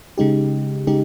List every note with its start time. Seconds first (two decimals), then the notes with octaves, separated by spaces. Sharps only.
0.18 C#3 G#3 D#4 G4
0.87 C#3 G#3 D#4 G4